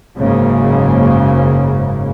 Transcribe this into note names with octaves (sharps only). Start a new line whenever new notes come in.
F#1 G#2 C#3 A#3